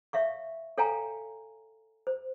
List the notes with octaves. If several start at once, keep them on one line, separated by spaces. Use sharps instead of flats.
C#5 E5 F5 C#6
A4 C#5 F5 G5 G#5 A#5
C5